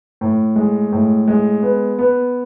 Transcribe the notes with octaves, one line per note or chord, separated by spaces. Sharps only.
A2
G#3
A2
G#3
B3
B3